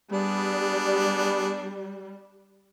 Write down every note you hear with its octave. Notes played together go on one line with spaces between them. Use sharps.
G3 B3 D4 G#4